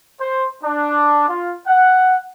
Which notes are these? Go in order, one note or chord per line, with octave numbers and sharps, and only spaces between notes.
C5
D4
F4
F#5